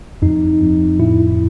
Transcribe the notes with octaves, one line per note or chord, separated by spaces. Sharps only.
F2 D#4
F2
A2 E4